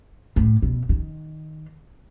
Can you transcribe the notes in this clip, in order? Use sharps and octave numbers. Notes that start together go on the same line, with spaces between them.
A2
B2
D#3